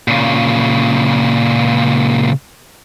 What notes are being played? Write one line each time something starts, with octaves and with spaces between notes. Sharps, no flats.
A#2 C#3